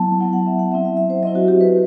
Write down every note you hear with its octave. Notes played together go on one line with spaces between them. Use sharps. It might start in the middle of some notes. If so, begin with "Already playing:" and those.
Already playing: F#3 B3 E4 A5
F#3 B3 E4 F#5
F#5
E5
F#5
F#3 C4 E4 E5
E5
E5
C5
F#3 C4 E4 D#5
F#4
G4
B4